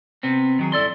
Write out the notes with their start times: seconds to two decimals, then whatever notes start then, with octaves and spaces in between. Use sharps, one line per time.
0.23 C3 B3 C4
0.59 D#3 F#3 G#4
0.72 G2 E4 A4 D5 C6